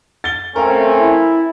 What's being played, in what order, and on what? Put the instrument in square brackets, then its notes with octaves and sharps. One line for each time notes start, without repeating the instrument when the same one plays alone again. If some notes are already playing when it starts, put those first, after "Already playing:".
[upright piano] A6 G7
[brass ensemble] A3 C4 C#4 [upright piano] A#4 F5
[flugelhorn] E4